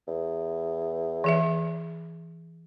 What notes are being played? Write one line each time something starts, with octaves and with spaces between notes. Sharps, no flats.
E2
E3 G#4 E5